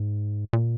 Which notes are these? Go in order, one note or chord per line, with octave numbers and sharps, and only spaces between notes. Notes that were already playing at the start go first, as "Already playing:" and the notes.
Already playing: G#2
A#2